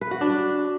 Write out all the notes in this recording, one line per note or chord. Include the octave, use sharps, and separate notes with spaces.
B4
F#4
D4